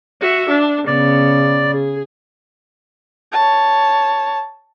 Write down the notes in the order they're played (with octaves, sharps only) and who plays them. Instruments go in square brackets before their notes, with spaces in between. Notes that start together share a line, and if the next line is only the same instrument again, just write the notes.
[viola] F#4 E5
D4
[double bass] C#3 [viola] B3 [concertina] D5
[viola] G#4
[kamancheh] C#5 A5